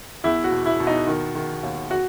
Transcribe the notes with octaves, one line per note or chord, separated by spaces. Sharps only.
E2 E4
F#4
B2
E4
B2
D#4
D#3
D#3
D#2
F#4